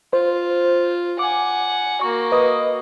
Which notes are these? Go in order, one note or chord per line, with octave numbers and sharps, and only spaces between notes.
F4 C5
F#5 G#5 D6
A#3 F#4 C#6
B4 D#5 D#6